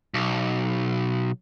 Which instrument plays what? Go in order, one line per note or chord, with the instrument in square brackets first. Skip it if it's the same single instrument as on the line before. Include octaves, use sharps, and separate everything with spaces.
[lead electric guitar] B1